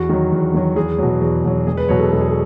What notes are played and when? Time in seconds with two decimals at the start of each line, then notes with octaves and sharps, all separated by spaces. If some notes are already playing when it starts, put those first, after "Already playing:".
Already playing: E2 F#4
0.09 D#3 F#3
0.32 E2
0.54 D#3 F#3
0.76 E2 G#4
0.99 B2 F#3
1.21 E2
1.44 B2 F#3
1.67 E1 G#4
1.77 B4
1.89 E2 B2 F#3 C#5
2.00 A4
2.12 E1 A4
2.21 G#4
2.29 A4